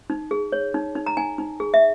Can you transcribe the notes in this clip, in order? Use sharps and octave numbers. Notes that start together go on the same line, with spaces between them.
D#4
G#4
C#5
D#4
D#4
A#5
D#4 G#5
D#4
G#4
E5